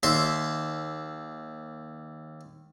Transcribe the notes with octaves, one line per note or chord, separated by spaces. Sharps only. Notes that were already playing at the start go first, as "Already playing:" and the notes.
D#2 E5 C6